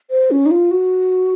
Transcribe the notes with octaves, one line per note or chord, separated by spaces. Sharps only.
C5
C#4
D#4
F4
F#4